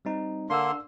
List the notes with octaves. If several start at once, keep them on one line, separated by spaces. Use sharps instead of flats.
G3 C4 D#4
D3 A#3 D4 C6 E6